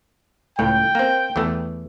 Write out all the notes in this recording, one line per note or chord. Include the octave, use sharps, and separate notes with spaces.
C#2 A2 G5
A#3 C4
E2 E3 A3